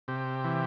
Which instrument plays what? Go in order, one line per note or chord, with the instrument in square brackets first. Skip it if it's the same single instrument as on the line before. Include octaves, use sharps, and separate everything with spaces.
[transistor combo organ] C3 G4
E3